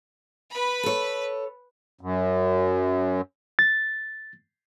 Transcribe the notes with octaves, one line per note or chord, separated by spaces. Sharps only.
B4 B5
A4 C#5
F#2
A6